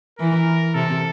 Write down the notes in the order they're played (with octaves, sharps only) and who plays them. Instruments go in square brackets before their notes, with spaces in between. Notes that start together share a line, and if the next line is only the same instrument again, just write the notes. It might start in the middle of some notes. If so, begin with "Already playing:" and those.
[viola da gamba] E3 [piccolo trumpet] A#4
[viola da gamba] C3 [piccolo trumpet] A4